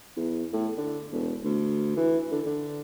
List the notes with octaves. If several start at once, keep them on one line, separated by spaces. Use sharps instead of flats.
E2
A2
D3
E1
D2
E3
D3
D3